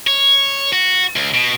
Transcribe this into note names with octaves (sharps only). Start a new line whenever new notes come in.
C#5
F#4
C#2
B2